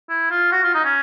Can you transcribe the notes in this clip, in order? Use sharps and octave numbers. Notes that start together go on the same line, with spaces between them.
E4
F4
F#4
F4
D#4
C#4